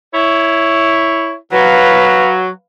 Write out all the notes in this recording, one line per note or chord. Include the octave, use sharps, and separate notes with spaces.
E4 C#5
F#3 B4 F5